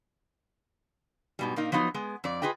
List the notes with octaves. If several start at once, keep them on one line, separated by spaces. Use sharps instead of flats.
G#2 B2 G3
A#2 A#3 D#4
F3 F#3 B3 D#4
G#3 B3
F2 D5
F4 G#4 B4 D#5 G5